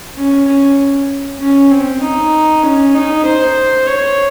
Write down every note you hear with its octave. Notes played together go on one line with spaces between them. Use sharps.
C#4
C#4
C#4
C4
D#4
C#4
D#4
C5
C#5